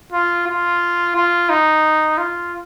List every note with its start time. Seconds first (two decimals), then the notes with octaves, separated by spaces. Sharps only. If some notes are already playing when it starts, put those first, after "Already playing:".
0.13 F4
0.47 F4
1.16 F4
1.49 D#4
2.18 F4